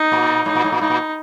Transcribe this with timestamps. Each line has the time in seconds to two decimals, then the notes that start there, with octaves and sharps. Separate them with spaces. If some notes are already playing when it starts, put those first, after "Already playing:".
Already playing: D#4
0.12 A#2
0.46 G#2 D#4
0.55 A#2
0.64 G#2
0.72 A#2
0.81 G#2 D#4
0.90 A#2